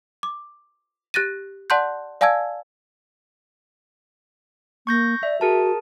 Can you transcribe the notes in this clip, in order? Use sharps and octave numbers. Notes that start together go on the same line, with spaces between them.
D6
G4 F#6 A6 A#6 D#7
D5 F#5 A5 C6 F#6 G6
D5 F5 G#5 A5 E6 G#6
A#3 C#6 G6 A#6
D5 E5
F#4 G#4 A#4 A5